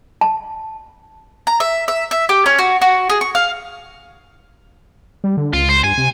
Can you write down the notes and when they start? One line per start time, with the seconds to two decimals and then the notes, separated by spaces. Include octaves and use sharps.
0.21 A5
1.47 A#5
1.60 E5
1.88 E5
2.11 E5
2.29 G4
2.46 C#4
2.59 F#4
2.82 F#4
3.10 G#4
3.21 C#6
3.35 F5
5.24 G3
5.37 D3
5.53 C#2 F4
5.69 C5
5.84 G2 G#5
5.98 C3